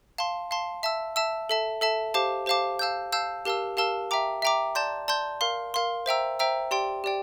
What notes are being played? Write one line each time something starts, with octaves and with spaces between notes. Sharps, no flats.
F5 A5 C6
F5 A5 C6
E5 A5 E6
E5 A5 E6
A4 E5 A5
A4 E5 A5
G4 C5 F5 A5 D6
G4 C5 F5 A5 D6
F5 A5 E6 G6
F5 A5 E6 G6
G4 A#4 F5 A5 E6
G4 A#4 F5 A5 E6
E5 G5 A#5 D6
E5 G5 A#5 D6
D5 A5 C6 G6
D5 A5 C6 G6
A#4 F5 C6
A#4 F5 C6
C5 E5 G5 A#5 E6
C5 E5 G5 A#5 E6
G4 D5 G5 C6
G4 D5 G5